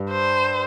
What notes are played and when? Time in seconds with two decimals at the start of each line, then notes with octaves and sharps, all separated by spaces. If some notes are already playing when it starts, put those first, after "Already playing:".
Already playing: G2
0.10 C5